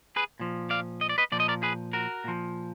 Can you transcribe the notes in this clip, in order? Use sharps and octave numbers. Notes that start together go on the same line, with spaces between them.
G#4 B4
A#2 F3
D5 F5
D#5
D5
B4 D#5
A#2 F3 D5
D#5
A#4 D5
G#4 B4
F#4 A#4
A#2 F3